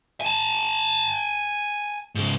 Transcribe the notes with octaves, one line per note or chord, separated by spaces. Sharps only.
G#5 A5
G#2 C#3